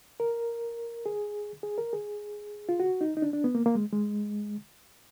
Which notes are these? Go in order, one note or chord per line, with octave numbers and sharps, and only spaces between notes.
A#4
G#4
G#4
A#4
G#4
F4
F#4
D#4
D#4
D4
D4
B3
A#3
A#3
G#3
G#3